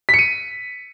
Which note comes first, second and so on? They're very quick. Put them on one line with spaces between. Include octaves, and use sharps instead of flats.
B6 C#7 D#7